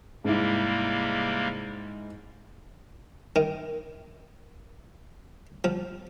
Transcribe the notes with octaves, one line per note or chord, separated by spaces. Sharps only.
G#2 C3 G3 A#3 E4
D#3
F3